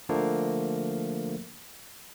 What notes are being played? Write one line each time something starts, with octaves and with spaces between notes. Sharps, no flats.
D3 F3 A3 A#3